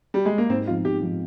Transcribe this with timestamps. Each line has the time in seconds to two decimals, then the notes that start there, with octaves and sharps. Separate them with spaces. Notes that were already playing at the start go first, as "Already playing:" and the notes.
0.14 G3
0.26 G#3
0.38 A#3
0.49 G#2 C4
0.67 F3 C4 D#4 F4
0.85 G#2 G4
1.02 F3 C4 D#4